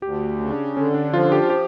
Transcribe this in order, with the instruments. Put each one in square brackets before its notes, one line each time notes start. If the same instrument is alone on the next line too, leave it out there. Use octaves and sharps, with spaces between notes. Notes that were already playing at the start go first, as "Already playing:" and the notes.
[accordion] D2 [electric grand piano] G4
[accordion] C#3
[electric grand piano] D4
[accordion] D3 [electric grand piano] C#4
[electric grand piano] D4
[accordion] F3 [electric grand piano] F4
[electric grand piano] G4
G4